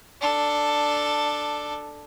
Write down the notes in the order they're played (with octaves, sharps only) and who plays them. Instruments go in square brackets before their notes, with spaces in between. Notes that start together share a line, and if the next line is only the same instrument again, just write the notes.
[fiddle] D4 A4